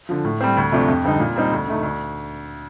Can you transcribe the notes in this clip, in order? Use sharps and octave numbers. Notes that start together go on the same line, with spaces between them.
D3 F3
A2
G3 C4
D2
C3 F3 A3 D4
F2
D3 G3 C4 D#4
A#2
G3 C4 D#4
D2
D3 A3 D#4
D2